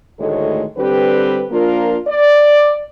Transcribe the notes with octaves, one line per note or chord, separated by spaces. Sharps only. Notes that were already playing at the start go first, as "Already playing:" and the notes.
D2 A2 D#3 G#3 A4 C#5
D3 G3 C4 G4 B4
F3 A#3 D4 F4 A#4
D5